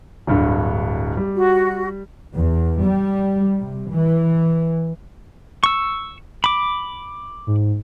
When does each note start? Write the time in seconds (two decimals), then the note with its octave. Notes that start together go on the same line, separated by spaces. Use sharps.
0.27 D1 G2 D3
1.17 G3
1.35 F#4
2.35 E2
2.84 G3
3.62 C3
3.91 E3
5.64 C#6 E6
6.44 B5 D6
7.47 G#2